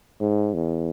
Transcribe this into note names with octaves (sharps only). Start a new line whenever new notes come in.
G#2
E2